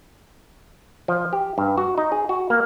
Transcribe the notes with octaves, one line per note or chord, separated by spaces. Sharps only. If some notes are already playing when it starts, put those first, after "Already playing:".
F3
G4
G2
F#4
D#4
G#4
F#4
A#3